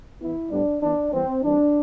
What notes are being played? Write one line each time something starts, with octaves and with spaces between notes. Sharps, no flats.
E3 B3 E4
A2 G3 B3 D4
E3 B3 D4
E3 G3 B3 C4
E3 G3 C4 D4